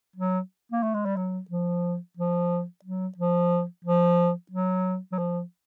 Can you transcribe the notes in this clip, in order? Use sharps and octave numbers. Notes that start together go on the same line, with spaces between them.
F#3
A#3
A3
G#3
G3
F#3
F3
F3
F#3
F3
F3
F#3
F#3
F3